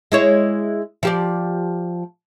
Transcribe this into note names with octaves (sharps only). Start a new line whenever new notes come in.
G#3 E4 C#5
F3 G4 D5